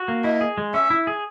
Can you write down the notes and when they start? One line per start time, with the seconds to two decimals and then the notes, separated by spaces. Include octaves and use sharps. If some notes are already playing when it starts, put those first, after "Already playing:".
Already playing: F#4
0.08 A#3
0.24 E4 D#5
0.41 G#4
0.58 G#3
0.74 C#4 E5
0.90 E4
1.07 G#4